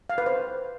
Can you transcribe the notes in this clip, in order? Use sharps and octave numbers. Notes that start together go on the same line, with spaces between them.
F5
B4
C5